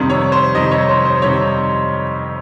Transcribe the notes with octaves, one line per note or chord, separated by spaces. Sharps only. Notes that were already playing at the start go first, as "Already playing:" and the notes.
Already playing: F2 C3 D#3 G3
C#5
C5
F2 C3 D#3 G3 D#5
C#5
C5
C5
F2 C3 D#3 G3 C#5